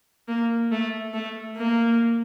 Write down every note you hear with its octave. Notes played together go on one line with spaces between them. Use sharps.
A#3
A3
A3
A#3